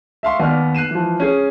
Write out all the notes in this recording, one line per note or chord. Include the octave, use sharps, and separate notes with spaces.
E5 F5 C6 C#6
D#2 B3 D5 F6
F#6 C7 D#7 E7
E3 F3
C#4 G#4